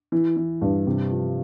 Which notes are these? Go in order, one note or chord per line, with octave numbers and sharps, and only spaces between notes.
E3
E3
G2
C3
F3